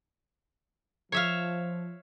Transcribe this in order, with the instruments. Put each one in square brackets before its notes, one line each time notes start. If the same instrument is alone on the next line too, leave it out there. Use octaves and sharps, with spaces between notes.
[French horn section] F3 [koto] C#5 E5 F5